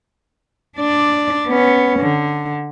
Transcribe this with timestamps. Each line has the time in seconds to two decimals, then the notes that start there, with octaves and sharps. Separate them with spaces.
0.78 D4 D5
1.48 B3 C#4
2.00 D3